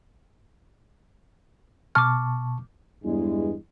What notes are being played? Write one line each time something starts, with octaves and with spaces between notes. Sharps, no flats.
B2 A5 C#6 D6 F6
E2 G2 G#3